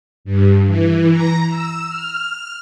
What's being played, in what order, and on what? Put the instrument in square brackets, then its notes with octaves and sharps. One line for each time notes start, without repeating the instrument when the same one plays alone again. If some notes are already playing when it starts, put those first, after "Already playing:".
[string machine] G2
E3
A#5
E6
F6